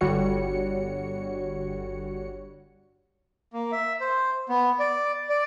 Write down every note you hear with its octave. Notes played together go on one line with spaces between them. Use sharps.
G1 D3 G3 F#4 C#5 C#7
A#3
E5
C5
B3
D5
D5